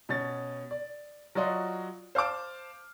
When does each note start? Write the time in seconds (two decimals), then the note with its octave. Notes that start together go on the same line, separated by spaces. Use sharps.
0.09 B2 C#4 A6
0.71 D5
1.35 F#3 F4 F#4 D5 D#5 C6
2.15 C5 F5 A5 D6 F6